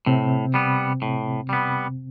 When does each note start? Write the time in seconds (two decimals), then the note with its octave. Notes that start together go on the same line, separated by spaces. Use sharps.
0.06 A2 C3 C4
0.54 G3 B3
1.02 A2
1.49 G3 B3